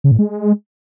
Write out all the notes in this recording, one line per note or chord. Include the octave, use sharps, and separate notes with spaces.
C#3
A2
G#3